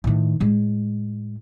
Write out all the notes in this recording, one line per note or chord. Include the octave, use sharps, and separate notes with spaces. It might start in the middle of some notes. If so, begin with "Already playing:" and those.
A2 D#3
A2 G#3